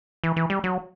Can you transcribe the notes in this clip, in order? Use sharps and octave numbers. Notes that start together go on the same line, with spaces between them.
E3
E3
G3
F#3